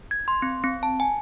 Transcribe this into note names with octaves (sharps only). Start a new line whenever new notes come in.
G#6
C6
C4
C4
A5
G#5